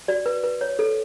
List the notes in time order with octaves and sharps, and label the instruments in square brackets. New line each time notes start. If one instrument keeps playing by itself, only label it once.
[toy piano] F#4 D5
B4
B4
C#5
A4